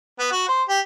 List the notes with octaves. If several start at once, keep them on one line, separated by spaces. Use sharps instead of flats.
B3
F#4
C5
G4